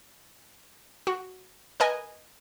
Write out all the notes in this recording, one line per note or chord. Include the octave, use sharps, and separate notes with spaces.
F#4
A#4 B4 D#5 G#5